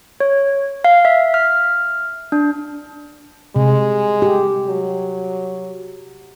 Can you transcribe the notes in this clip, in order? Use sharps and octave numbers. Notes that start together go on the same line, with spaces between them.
C#5
F5
E5
F6
D4
C3 G#3
G4
F#3